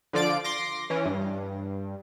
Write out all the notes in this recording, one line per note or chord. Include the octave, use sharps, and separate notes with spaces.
D3 F3 F4 D5 D6 D7
C6 D6 A#6
E3 C#4
G2